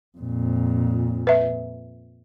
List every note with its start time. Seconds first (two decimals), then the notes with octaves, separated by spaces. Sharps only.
0.18 F2 A#2
1.27 B4 E5